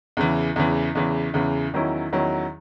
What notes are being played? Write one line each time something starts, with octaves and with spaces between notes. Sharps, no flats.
E2 C#3 E3
E2 C#3 E3
E2 C#3 E3
E2 C#3 E3
E2 D#3 F#3 C#4 E4
E2 D#3 F#3 C#4 E4